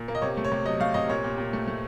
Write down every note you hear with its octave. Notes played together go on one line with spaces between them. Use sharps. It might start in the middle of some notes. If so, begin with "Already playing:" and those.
Already playing: A#2
A#3
D#5
C3 C#5
A3
C#5
C3
F#3 D#5
A3 F5
C3 D#5
A#2 C#5
A#2
A#2
A3
A3